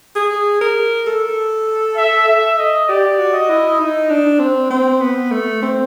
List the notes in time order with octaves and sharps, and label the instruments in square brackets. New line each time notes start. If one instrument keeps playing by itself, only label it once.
[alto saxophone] G#4
A#4
A4
[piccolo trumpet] E5
E5
D#5
[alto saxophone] G4 [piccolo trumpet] D5
[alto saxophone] F#4
[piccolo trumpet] D#5
[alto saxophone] E4
D#4
D4
C4
C4
B3
A3
C4